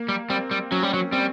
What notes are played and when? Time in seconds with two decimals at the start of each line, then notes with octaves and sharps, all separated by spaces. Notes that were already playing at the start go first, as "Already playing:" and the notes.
Already playing: A#3
0.09 G3
0.30 G3 C4
0.51 G3
0.71 F#3 C#4
0.83 G3
0.94 F#3
1.12 G3 C4